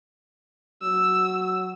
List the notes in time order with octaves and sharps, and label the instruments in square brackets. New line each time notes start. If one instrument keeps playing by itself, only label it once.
[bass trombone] F#3 [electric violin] E6